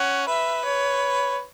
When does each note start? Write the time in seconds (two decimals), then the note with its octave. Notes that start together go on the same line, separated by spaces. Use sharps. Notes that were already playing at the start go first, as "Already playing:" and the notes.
Already playing: C#4 F#5
0.27 B4 E5
0.65 C#5